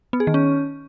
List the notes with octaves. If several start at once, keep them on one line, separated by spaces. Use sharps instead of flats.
B3
G#4
D#3
C#4